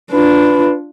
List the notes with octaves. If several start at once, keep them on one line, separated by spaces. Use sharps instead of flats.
D4 F4 B4